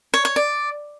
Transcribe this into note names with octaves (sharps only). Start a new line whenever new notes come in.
C#5
C#5
D5